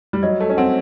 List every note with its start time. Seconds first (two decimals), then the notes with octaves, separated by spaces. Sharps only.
0.13 G3
0.23 F#3 D#5
0.40 A3
0.49 C#4
0.57 C4 F#5